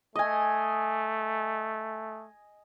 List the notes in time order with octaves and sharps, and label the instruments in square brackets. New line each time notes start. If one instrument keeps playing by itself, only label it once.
[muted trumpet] A3 [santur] D#5 G#5